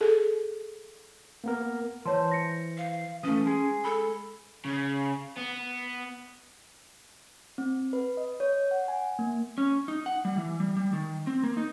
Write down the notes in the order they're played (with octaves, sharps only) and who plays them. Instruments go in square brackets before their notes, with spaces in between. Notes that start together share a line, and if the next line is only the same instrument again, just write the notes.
[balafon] G#4 A4
[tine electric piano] A#3 B3 A#4
[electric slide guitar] E3 C5 [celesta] C#5 A5 C6
[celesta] A#6 C#7
[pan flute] F5
[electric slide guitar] E3 A3 [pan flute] C#4 [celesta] D#6
[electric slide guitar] G#3 G#4
[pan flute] A4 [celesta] B5
[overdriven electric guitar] C#3
B3
[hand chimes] C4
B4
D#5
C#5
F#5
G#5
A#3
[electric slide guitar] C#4
D#4
F#5
G3
E3
G3
G3
D#3
C4
A#3
D#4